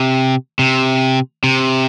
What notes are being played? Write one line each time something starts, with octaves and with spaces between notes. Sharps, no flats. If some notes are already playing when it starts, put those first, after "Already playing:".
Already playing: C3
C3
C3